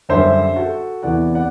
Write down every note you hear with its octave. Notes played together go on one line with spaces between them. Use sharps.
F#2 D3 G3 C5 E5
F#4 A4
E2 C3 E3 D5 F#5
D5 F#5